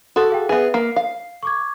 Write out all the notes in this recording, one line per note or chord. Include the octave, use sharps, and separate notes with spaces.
F#4 A4 C6 D#6
G#4 F5 G5
B3 G#4 B4 E5
A#3 C7
F5
C#6 D6 G#6